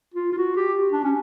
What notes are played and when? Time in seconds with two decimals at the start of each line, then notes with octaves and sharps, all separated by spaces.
0.14 F4
0.32 F4
0.38 F#4
0.56 G4
0.92 D4
1.04 C#4